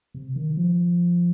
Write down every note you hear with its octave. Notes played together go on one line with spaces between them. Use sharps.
C3
D#3
F3